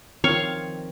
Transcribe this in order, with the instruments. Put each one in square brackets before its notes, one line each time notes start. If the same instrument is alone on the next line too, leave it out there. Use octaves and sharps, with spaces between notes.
[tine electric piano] D#3 F3 C4 [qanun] C#5 F5 C#6